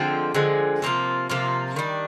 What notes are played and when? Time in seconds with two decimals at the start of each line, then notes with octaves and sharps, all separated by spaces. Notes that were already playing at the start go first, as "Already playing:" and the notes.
Already playing: D3 F3 G#3 C4
0.34 D3 F3 G#3 C4
0.82 C3 F3 A#3 F4
1.30 C3 F3 A#3 F4
1.76 D#3 G3 D4